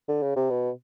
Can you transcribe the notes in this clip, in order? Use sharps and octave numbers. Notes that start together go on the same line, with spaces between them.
D3
C#3
C3
B2